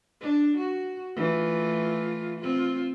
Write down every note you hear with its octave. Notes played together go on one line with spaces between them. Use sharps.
D4
F#4
E3 A3 F4
C4 F4